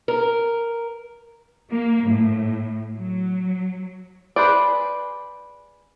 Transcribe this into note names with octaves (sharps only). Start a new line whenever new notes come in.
A#4
A#3
A2
F#3
G#4 B4 C5 D5